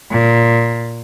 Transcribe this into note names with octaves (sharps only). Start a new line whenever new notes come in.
A#2